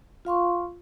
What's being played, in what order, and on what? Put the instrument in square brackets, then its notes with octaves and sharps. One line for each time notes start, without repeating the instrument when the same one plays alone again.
[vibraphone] F4 F5 C6 C#6